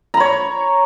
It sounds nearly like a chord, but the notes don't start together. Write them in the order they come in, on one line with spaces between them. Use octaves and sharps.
A#5 B5 C#5